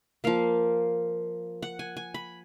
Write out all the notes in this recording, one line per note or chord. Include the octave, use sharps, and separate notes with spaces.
F3 A#3 F5
F#5
G#5
G#5
B5